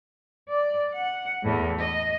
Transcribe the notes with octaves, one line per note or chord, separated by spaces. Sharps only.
D5
F#5
E2 A2
D#5